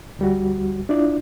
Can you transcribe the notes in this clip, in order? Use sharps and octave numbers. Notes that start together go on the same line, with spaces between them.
D2 G3 F#4
D4 E4 F4 D5